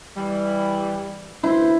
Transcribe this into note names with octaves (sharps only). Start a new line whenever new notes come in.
E3 G3
D2 E4 B4 C5